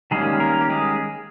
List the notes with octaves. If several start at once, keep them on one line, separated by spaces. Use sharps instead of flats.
D#3 G3 G#3 A#3 C#4 G#4
A#3 A#4
G4
G#3 G#4